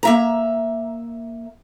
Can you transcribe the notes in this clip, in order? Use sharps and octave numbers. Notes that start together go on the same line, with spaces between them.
A#3 E5 A#5